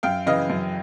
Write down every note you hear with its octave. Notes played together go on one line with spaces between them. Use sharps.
F#2 F5 G5
C#3 E3 D#5 F5
F#2